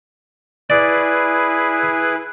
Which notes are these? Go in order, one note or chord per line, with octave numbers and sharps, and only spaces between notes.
E4 G#4 B4 D5